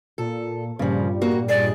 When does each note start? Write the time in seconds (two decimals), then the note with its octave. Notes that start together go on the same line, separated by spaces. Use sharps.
0.18 A#2 A4
0.79 G2 A#2 C#3 F3 G3
1.22 A#3 F#4
1.49 G#4 D5 D#5